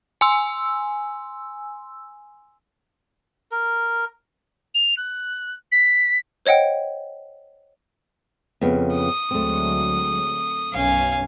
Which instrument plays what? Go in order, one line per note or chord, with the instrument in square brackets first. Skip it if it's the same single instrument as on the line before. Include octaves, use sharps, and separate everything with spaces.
[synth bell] G#5 C6 E6
[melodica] A#4
[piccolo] F7
F#6
B6
[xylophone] C5 C#5 D#5 F#5 G5
[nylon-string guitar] F2 C#3 B3
[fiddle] D#6
[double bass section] D2 F#3 G#3 [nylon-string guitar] A3 C4
[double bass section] B1 F#2 C#4 [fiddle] F5 G#5